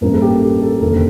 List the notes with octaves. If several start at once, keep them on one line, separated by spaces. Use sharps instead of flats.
A1 G2 F3 A#3
A4
G4
A4
F1 D#2 D3 F3 A#4